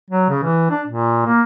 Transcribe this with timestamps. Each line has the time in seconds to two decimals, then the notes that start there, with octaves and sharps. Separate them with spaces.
0.10 F#3
0.29 C#3
0.43 E3
0.71 D4
0.87 A#2
1.26 A#3